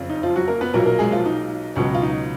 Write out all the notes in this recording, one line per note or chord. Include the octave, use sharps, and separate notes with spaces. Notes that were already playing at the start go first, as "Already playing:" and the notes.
Already playing: F#1 F2 C#3
D#4
F3 F4
F#3 F#4
A#3 A#4
B3 B4
B1 A#2 F#3 A#3 A#4
A#3 A#4
G#3 G#4
F3 F4
D#4
C#2 B2 F#3 C#4
F4
D#4